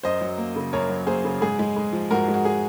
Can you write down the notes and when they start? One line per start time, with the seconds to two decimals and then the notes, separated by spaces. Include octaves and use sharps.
0.03 F#2 C5 D#5
0.21 F#3
0.38 A#3
0.56 C#3
0.73 F#2 A#4 C#5
0.89 F#3
1.07 A#3 G#4 C5
1.24 C#3
1.41 G#2 G#4
1.59 G#3
1.76 G#2
1.93 F3
2.11 G#2 F#4 A#4
2.28 G#3
2.34 F#4
2.45 G#4